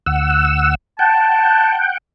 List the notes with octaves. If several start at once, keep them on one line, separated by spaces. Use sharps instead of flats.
D2 F#5 E6
F#5 G5 A5